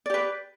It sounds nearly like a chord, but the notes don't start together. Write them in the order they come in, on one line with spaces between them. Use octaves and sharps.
D5 G4 B4